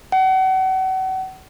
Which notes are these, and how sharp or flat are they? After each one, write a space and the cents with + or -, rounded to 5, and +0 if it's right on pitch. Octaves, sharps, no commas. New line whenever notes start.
F#5 +35